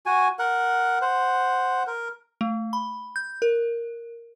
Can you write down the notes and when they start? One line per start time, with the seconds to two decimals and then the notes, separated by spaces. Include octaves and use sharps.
0.06 F#4 G#5
0.39 A#4 F#5
1.02 C5 F#5
1.87 A#4
2.41 A3
2.73 B5
3.16 G6
3.42 A#4